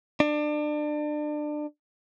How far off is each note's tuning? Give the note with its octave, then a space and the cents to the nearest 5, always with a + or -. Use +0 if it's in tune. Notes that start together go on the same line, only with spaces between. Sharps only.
D4 +30